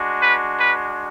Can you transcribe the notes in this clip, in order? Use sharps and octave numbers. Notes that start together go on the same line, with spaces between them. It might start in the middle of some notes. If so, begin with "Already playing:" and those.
Already playing: G#3 D4 F#4
B4
B4